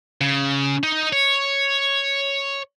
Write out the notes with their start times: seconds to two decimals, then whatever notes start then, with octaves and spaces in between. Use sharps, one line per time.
0.21 C#3
0.83 D#4
1.13 C#5